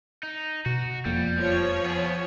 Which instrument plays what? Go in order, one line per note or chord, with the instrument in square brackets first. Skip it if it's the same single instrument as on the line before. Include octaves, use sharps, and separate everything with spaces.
[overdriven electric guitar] D#4
[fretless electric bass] B2 [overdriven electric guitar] F#4
[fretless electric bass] E1 F2 A#3 [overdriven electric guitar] G3
[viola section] F3 C#5
[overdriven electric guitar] B3 G#4